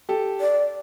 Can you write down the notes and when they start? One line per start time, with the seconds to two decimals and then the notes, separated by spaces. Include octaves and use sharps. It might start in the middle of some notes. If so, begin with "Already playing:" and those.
0.09 G4 A4
0.41 D5